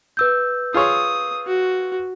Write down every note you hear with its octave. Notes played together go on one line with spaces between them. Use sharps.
B4 E6 G6
F4 G#4 C#5 D#6
F#4